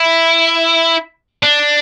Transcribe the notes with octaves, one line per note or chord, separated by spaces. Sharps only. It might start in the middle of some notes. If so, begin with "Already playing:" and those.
Already playing: E4
D4